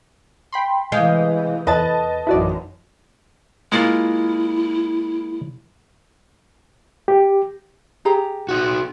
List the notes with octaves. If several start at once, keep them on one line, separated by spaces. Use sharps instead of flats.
G5 B5 C6
C3 E3 G#3 F5 D#6 G6
E2 B4 D#5 A5 A6
A1 F#2 D#3 E4 F#4 D5
G#3 A#3 E4 F4
G4
G4 G#4 A#5
D#4 F#4